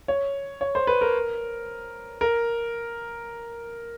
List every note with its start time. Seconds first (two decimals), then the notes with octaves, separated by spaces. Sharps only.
0.08 C#5
0.61 C#5
0.75 C5
0.87 B4
1.01 A#4
2.21 A#4